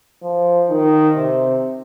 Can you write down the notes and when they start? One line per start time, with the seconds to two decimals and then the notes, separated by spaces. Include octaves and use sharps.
0.22 F3
0.70 D#3
1.16 C3